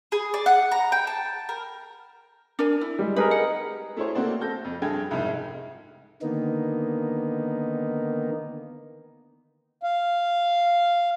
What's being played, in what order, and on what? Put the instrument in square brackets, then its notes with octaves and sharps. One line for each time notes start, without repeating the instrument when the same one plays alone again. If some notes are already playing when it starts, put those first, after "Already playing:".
[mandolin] G#4
D5
F#5
A#5
G5
A5
A#4
[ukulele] D4 A#4 G#5
E4
[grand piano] G3 G#3
[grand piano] D#4 G#4 A#4 [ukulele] B4
[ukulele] F#5
[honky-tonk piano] A3 E4 G#4 C5 C#5
A3 A#3 C4 F#4 C5 D5
A4 G6 A#6
F2
G2 G#4 A4 G5 G#6
C2 F2 G#2
[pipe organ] D3 D#3 A#3 B3 D#4
[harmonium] F5